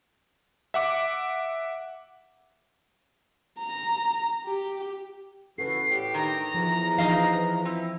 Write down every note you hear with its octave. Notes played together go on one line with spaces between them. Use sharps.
E5 F#5 D6
A#5
G4
C#3 E3 F#4 A4 B4 C7
A2 G4
D#3 A#5
E2 F3
E3 F3 D#4 D#5 F5
C4 E4